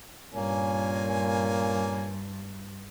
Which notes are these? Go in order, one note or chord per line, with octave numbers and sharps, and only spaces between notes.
G2 A#2 A#3 C#4 G#5